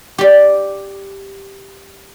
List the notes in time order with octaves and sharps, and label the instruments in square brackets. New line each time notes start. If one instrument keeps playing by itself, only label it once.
[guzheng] G4 D5